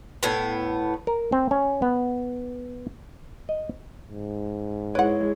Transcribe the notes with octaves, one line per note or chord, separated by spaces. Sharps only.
A2 B3
A#4
C4
C#4
B3
D#5
G#2
G#3 E4 B4 C#5 F#5